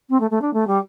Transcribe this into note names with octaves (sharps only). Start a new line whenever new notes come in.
C4
A3
A3
D4
A3
G3